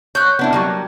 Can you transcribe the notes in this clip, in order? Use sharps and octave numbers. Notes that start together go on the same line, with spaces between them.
C#5 F#6 G6
B3 D4 E4
F#3 G3 A#3